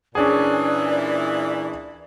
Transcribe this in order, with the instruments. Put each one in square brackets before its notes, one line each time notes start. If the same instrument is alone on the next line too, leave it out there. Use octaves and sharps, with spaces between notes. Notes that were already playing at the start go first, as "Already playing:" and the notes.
[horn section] A#2 E3 [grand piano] C#4 D4 G#4 [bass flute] D5